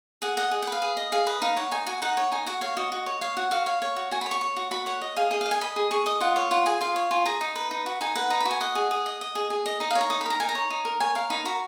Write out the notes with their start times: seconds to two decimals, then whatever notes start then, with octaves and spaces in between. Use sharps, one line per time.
0.22 G#4 F#5
0.37 D#5 F#5
0.51 G#4
0.62 F#5
0.67 B4 F5
0.82 G#4
0.97 D#5
1.12 G#4 F5
1.27 B4 D#5
1.42 D#4 F5
1.57 C#5 F#5
1.71 D#4 G#5
1.86 F#4 G#5
2.02 D#4 F#5
2.17 C#5
2.32 D#4 G#5
2.46 F#4 F#5
2.61 C#5 F5
2.77 F#4 D#5
2.92 F#4
3.06 C#5
3.21 C#5 F5
3.37 F#4 F#5
3.51 F#4 F5
3.66 C#5 F5
3.82 C#5
3.96 F#4
4.11 F#4 G#5
4.21 B5
4.26 C#5
4.31 C#6
4.41 C#5
4.56 F#4
4.71 F#4 B5
4.86 C#5 F#5
5.01 D#5
5.16 G#4 F5
5.31 G#4 D#5
5.41 D#5 F5
5.51 G#5
5.61 D#5 B5
5.76 G#4
5.91 G#4 C#6
6.06 D#5 D#6
6.20 F4 F#5
6.36 C#5 F5
6.51 F4 F#5
6.66 G#4 G#5
6.81 F4 F5
6.96 C#5
7.11 F4 G#5
7.25 G#4 A#5
7.41 D#4
7.55 B4
7.71 D#4
7.86 F#4
8.01 D#4 G#5
8.15 B4 F#5
8.30 D#4 A#5
8.40 B5
8.45 F#4
8.51 G#5
8.61 D#5 F#5
8.75 G#4
8.91 G#4
9.06 D#5
9.21 D#5
9.35 G#4
9.50 G#4
9.66 D#5
9.80 D#4 D#5
9.91 F5
9.95 C#5
10.01 A#5
10.10 D#4 D#6
10.21 B5
10.26 A#4 A#5
10.40 D#4 G#5
10.49 A#5
10.55 C#5
10.70 D#4
10.85 A#4
11.00 C#5 G#5
11.15 A#4 F5
11.30 D#4 B5
11.45 F#4 A#5